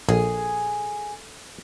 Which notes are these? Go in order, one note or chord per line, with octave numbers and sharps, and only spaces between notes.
A#1 G#4 A4